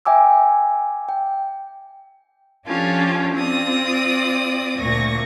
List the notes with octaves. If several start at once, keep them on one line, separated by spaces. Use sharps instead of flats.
E5 G5 G#5 D6 E6
G5
F3 C#4 D4 F4 G4 A4
C4 F4 D5 D#6
D2 A#2 C#6 A#6